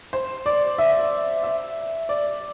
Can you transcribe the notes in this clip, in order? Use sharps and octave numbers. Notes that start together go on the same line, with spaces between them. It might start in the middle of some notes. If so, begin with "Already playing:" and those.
C5
D5
E5
E5
D5